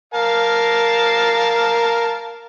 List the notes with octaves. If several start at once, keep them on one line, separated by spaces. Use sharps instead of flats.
A#4 F5 A5